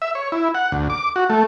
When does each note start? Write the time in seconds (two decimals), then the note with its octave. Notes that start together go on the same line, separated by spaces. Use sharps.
0.02 E5
0.15 C#5
0.32 E4
0.55 F#5
0.72 D2
0.90 D6
1.16 F#4
1.30 A3